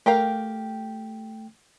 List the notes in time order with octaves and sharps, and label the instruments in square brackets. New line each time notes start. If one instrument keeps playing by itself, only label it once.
[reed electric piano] A3 G5 [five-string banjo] G4 A#4 F5